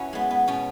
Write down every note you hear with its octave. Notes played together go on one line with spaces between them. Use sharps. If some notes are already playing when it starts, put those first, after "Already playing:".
Already playing: C#4 E4 F#4 B4
G#3 B3
B3
B2 C#4